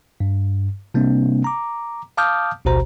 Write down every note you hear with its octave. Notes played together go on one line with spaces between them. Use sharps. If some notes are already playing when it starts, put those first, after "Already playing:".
G2
C3 G3 A#3 C4 D4
A#5 D6
F5 A5 D6 D#6 F6 G6
A1 D2 B2 F#4 C5 A#5